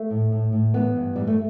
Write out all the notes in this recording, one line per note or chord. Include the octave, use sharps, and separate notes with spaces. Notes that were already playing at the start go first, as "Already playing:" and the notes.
Already playing: A3
A2
A2
A2
E3 B3
G2
E3 G3
A3